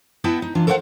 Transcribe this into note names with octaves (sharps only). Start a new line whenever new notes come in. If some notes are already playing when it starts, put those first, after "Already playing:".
B3 E4 D#5 F#5 G5 A5
D#4
E3 D4 F4
A4 A#4 C5 D5 F5 F#5